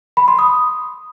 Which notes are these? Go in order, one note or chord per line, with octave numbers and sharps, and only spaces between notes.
B5
C6
D#6